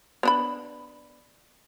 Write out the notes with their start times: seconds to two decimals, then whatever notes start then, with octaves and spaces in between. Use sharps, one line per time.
0.23 B3 D4 B5